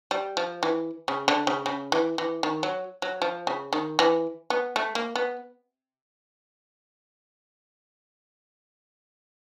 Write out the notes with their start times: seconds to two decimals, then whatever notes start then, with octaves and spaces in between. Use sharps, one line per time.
0.11 G3
0.37 F3
0.63 E3
1.08 C#3
1.28 D3
1.47 C#3
1.66 C#3
1.92 E3
2.18 E3
2.43 D#3
2.63 F#3
3.02 F#3
3.22 F3
3.47 C#3
3.73 D#3
3.99 E3
4.50 B3
4.76 A3
4.95 A#3
5.16 B3